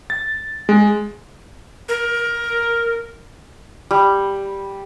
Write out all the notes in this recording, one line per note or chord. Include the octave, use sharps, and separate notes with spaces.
A6
G#3
A#4
G3